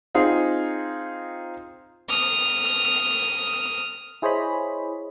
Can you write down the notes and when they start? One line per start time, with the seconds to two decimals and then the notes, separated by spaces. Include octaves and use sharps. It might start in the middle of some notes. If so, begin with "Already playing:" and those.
0.15 C4 D#4 F4 G#4
2.09 D#6 F6
4.22 E4 G#4 C5 C#5 D#5 B5